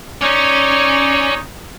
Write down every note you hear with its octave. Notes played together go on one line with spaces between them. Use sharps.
C#4 D#4 C#5 D5